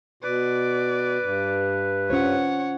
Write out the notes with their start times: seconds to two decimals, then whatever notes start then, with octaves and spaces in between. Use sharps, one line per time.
0.23 B2 B4 D5
1.22 G2
2.10 C#4 F4 C5 C#5 F#5